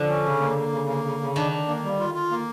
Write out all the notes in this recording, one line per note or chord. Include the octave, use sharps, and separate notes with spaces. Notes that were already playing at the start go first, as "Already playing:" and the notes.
Already playing: D3 F3
C#4
C#3
A#3
A#3
C#3
A#3
C#3
C#3
D#3 D4
D4
A#3
G3
F4
F4
A#3